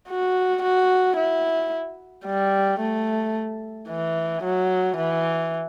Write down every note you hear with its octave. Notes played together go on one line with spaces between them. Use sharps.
F#4
F#4
E4
G3
A3
E3
F#3
E3